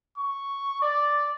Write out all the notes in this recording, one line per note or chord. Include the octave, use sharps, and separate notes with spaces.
C#6
D5